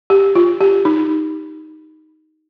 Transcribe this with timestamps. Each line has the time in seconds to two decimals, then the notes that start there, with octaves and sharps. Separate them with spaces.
0.10 G4
0.35 F4
0.61 G4
0.85 D#4